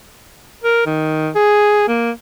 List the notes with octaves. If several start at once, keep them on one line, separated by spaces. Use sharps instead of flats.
A#4
D#3
G#4
A#3